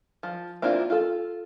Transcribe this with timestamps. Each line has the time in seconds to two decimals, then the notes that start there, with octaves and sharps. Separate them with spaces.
0.23 F3
0.62 A#3 C4 D4 E4 F4
0.90 F4 A4